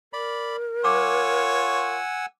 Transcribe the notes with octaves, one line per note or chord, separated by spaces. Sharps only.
A#4 D5 B5
F4 C#5 F#5 G#5 D6 E6